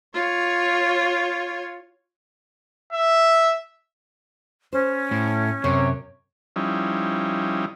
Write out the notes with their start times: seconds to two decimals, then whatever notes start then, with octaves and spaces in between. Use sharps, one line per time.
0.14 F4 C#5
2.93 E5
4.73 C#4 C5
5.11 A2
5.64 F#2 C3 C#5
6.56 F3 G3 C#4 D#4 E4